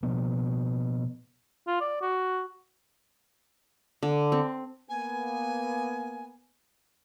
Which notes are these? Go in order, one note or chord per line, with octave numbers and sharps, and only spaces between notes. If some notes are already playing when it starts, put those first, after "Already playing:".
B2 F3 A#3 B3
F4
D5
F#4
D3
C4
A#3 B3 G#5